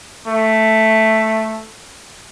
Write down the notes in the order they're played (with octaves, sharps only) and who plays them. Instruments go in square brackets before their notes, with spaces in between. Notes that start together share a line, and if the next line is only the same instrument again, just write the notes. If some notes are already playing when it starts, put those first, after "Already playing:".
[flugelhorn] A3